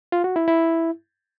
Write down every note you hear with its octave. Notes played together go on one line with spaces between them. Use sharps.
F4
F#4
E4
E4